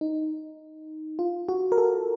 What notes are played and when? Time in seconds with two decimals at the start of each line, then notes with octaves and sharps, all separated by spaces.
0.01 D#4
1.19 F4
1.49 F#4
1.72 A#4
1.78 A4